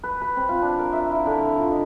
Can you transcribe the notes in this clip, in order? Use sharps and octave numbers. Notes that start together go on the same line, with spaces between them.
B4
B4
C4
F4
D4
A#4
E5
E4
D3
A#5
F4
D#5